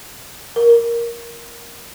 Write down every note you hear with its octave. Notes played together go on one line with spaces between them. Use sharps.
A#4